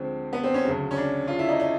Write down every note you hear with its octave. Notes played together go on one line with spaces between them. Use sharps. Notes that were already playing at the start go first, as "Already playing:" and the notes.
Already playing: D2 D3 F3 G#3 C4
B3
C4
C#4
D2 C#3 F#3
C#4
D4
F4
E4
D#4
D#4